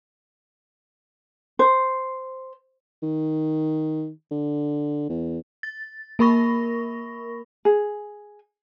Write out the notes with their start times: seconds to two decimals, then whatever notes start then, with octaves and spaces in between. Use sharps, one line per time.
1.59 C5
3.03 D#3
4.31 D3
5.09 E2
5.63 A6
6.19 A#3 A#4 B5 C#6 A#6
7.65 G#4